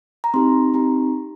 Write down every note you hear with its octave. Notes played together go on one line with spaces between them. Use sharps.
A#5
C4 D#4 G4 C6
C4 D#4 G4 A#5